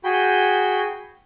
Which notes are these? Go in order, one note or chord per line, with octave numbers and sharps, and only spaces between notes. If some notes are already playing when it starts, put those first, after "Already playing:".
F#4 G#4 G5 B5 G6